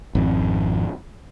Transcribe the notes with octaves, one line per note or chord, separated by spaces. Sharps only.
G#1 F2